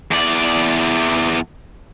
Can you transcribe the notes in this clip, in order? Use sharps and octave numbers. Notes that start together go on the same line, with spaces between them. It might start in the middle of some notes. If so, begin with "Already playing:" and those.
E2 D5